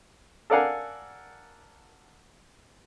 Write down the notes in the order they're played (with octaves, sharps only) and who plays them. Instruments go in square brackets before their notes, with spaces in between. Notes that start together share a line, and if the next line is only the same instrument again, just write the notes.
[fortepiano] A4 A#4 D5 F5 F#5 G#5